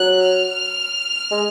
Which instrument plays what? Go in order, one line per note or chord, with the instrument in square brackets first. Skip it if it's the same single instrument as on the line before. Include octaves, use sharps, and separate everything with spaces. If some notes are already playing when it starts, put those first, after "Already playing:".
Already playing: [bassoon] F#3 [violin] F#6
[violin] F6
[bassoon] G#3